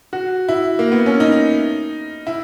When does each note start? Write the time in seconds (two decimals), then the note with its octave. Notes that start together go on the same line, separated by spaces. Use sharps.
0.13 F#4
0.48 E4
0.79 A#3
0.92 B3
1.06 C#4
1.20 D#4
2.27 E4